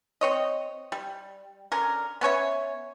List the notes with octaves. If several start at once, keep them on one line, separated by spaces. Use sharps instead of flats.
C4 C#5 D#5
G3
D3 C#4 A#4
B3 C#4 C#5 E5